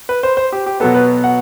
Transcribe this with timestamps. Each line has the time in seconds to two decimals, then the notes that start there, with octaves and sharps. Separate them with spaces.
0.09 B4
0.23 C5
0.37 C5
0.52 G4
0.66 G4
0.80 B2 F#3 B3 A4
0.94 B4
1.24 F#5